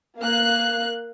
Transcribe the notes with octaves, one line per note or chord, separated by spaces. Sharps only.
A#3 F5 F#6